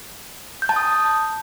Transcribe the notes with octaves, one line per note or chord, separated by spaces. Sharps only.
G6
A5
D#6